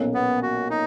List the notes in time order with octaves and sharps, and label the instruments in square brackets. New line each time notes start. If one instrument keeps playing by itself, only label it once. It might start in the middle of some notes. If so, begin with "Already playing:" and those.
Already playing: [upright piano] B1 A#2 A#3 C#4
[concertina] B3
F#4
D#4